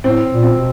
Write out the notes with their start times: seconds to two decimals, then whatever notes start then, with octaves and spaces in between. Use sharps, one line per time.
0.04 A2 C4
0.31 A#2
0.43 C4
0.56 B2